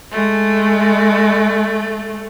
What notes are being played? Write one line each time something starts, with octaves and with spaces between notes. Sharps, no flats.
G#3 A3